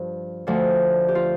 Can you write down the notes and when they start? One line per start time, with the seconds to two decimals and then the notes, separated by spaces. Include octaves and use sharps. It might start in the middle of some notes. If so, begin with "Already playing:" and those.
Already playing: G2 F3
0.47 D2 D3 F3
1.08 G4
1.15 F4